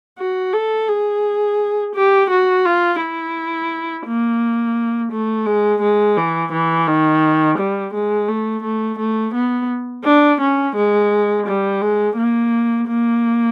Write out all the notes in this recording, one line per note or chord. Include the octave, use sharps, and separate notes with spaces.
F#4
A4
G#4
G4
F#4
F4
E4
A#3
A3
G#3
G#3
E3
E3
D#3
G3
G#3
A3
A3
A3
B3
D4
C#4
G#3
G3
G#3
A#3
A#3